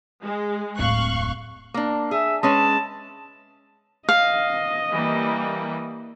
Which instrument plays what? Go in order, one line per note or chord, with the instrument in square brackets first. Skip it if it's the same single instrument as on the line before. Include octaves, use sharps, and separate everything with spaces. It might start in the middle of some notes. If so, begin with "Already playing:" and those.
[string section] G#3
[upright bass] D1 F2 [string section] F5 C#6 F#6
[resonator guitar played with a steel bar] A#3 D4
[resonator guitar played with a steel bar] G#4 [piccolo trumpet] E5
[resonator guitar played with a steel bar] G#3 C#4 B4 [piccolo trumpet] A5
[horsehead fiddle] D#5 [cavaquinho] F5
[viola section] E3 G3 A#3